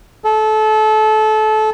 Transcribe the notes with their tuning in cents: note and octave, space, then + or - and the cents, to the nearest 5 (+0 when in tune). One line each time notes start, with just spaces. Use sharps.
A4 -25